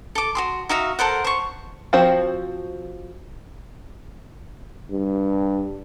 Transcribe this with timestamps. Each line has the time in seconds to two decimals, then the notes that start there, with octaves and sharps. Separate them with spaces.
0.15 A4 D6
0.35 F#4 G#4 C6
0.69 D#4 F#4 E5 F5
0.99 A4 A#4 C5 F#5
1.24 C5 C#6
1.93 F3 C4 F#4 C5
4.91 G2